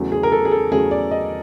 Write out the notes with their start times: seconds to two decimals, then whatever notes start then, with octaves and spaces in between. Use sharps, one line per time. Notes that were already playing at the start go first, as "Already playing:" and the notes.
Already playing: E2 C#3 F#3 A3
0.12 G#4
0.23 A#4
0.32 A4
0.45 G#4
0.52 A4
0.72 E2 C#3 F#3 A3 G#4
0.91 D5
1.11 D#5